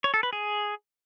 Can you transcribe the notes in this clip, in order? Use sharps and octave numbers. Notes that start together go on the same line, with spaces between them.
C#5
A4
B4
G#4